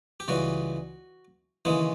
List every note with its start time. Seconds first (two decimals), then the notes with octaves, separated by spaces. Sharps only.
0.20 G4
0.28 C#2 C#3 E3 G3 F#4
1.65 D#2 C#3 E3 G#3 E4